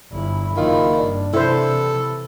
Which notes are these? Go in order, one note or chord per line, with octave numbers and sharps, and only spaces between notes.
G1 E4
F#1 D#3 E4 F4
G2 D4
C3 E3 E4 A4 C5